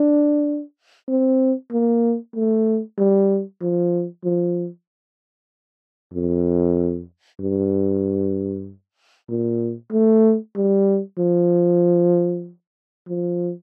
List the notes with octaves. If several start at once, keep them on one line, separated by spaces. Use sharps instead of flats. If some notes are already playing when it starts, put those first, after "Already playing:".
Already playing: D4
C4
A#3
A3
G3
F3
F3
F2
G2
A#2
A3
G3
F3
F3